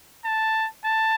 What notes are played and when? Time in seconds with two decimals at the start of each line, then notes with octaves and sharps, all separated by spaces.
0.25 A5
0.85 A5